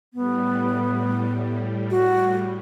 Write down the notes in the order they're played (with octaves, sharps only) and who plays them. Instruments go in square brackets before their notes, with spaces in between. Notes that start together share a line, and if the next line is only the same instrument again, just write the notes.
[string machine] A2 G3 [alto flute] B3
[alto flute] F#4